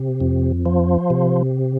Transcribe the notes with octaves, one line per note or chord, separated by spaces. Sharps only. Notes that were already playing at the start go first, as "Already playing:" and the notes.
Already playing: C3
F2
F3
C3